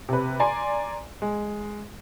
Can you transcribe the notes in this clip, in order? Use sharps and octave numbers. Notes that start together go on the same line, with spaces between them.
C3 B4
D5 G#5 A#5 C6
G#3